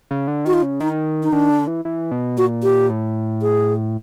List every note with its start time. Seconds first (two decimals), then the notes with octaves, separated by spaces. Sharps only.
0.11 C#3
0.28 D3
0.45 D#3 F#4
0.53 F4
0.63 C#3
0.81 D#3 D#4
1.23 D#4
1.32 D#3 D4
1.50 D3
1.67 E3
1.85 E3
2.11 B2
2.37 A#2 F#4
2.63 G4
2.90 A2
3.42 G#4